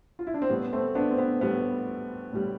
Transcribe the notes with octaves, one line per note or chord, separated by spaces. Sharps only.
F4
E4
D4
C4
A2 G3 B3
A3 C4
B3 D4
C4
B3
A2 G3 B3
A2 G3